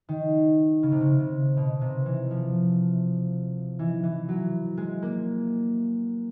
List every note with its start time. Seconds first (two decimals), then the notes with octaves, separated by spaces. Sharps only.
0.09 D#3
0.83 C#3
0.92 C3
1.01 C#3
1.19 C3
1.57 B2
1.81 C3
2.06 E3
2.31 F3
3.79 E3
4.03 E3
4.29 F#3
4.77 G#3
5.02 A#3